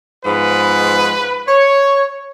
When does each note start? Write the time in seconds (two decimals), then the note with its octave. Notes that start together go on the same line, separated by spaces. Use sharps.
0.24 G#2 F3 G#3 B3 B4
1.48 C#5